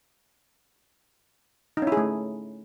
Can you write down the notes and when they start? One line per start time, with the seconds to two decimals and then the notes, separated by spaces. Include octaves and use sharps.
1.77 D#4
1.82 C#4
1.87 E4
1.92 G#4
1.97 A3